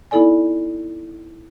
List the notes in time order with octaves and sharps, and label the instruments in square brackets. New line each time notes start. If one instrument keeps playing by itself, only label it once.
[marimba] B3 D#4 E4 A4 D5 G#5